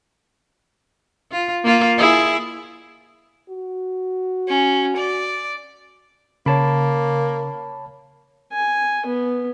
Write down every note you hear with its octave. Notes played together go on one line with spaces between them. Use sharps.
F4
A#3 F4
E4 G#4
F#4
C#4
D5
C#3 A#3 C#5 A5 B5
G#5
B3